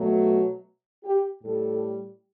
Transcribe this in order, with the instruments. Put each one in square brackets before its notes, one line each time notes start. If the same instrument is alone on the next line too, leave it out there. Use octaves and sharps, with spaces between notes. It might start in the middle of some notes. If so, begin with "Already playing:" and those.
Already playing: [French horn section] B2 F#3 A3
G4
A2 G3 A4